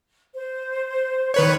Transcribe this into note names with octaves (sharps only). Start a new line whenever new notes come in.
C5
D#3 B4 C#5